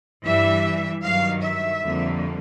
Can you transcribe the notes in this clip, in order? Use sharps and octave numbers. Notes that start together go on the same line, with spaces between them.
G2 E3 G3 E5
G2 D#3 F#3 F5
E5
F2 D3 G3 A#3